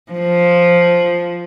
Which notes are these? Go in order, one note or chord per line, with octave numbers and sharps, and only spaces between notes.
F3